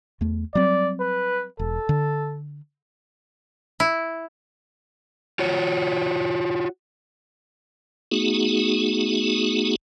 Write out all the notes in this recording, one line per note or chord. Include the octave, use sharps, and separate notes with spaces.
E2 A3
F#3 G3 C4 D5
B4
E1 A4
D3
E4
F4 F#4 C#5
A3 B3 D#4 F#4 G#4